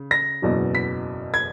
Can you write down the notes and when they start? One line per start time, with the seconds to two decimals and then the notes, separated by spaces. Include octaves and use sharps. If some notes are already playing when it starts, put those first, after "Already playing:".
Already playing: C#3
0.11 A#6
0.42 F#1 E2 B2 F#3
0.75 B6
1.34 G#6